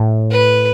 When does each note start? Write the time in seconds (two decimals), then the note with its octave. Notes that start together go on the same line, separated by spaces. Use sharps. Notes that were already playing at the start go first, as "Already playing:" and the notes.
Already playing: A2
0.31 B4